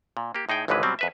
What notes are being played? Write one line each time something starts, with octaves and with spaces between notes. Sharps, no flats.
A#2
A#3 G4
A2 D#4 G#4 G5
G#1 C#2 D3 E3 G#3 B4
B2 F#3 G3 C4
F2 B4 E5